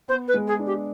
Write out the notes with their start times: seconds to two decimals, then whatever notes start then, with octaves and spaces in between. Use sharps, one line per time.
0.08 B3 C5
0.28 B4
0.34 G#3
0.47 G#4
0.59 D4
0.66 G4